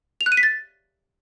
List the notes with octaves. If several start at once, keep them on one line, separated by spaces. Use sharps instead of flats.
F7
F#6
D#7
B6
A6